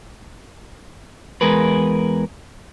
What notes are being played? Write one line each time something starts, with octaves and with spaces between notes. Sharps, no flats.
E2 G#3 G#4 A#4 B4